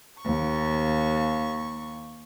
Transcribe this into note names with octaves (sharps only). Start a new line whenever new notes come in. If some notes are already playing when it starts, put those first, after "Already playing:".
D#2 C#6